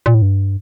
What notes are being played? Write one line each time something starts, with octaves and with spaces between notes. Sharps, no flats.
A#2
A2
G2